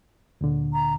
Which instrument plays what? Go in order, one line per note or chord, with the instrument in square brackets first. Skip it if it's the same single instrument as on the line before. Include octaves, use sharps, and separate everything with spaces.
[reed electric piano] D2 A#2 D3
[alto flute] A#5